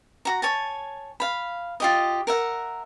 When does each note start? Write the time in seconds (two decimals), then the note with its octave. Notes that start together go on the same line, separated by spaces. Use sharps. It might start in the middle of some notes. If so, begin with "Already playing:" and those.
0.25 F#4 A#5
0.42 C#5 G#5 A5
1.20 F5 B5
1.80 F4 G4 D#5
2.27 A#4 E5 F#5